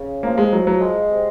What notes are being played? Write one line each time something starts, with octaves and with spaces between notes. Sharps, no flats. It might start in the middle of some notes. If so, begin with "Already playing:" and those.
Already playing: C#3
F3 A#3
G#3
F3 F#3
F#3
G#3
C3